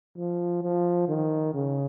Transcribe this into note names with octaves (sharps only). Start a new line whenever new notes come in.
F3
F3
D#3
C#3